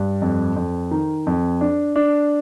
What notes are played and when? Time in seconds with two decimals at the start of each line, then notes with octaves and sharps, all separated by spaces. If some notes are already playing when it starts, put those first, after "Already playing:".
Already playing: G2
0.22 F2
0.56 F2
0.91 D#3
1.27 F2
1.61 D4
1.96 D4